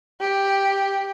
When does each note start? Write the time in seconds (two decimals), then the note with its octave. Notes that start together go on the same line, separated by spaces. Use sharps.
0.21 G4